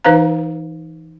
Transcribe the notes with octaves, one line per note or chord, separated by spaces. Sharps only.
E3 D#4 B4 C5 F5 A#5